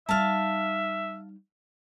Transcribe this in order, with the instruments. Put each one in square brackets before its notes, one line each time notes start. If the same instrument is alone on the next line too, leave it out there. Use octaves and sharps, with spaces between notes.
[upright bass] G3 D#4 [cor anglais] E5 [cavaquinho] F5 A5